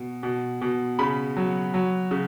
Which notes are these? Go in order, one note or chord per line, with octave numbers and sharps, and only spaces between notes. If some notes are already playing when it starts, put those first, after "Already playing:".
Already playing: B2
B2
B2
C#3 B5
F#3
F#3
C#3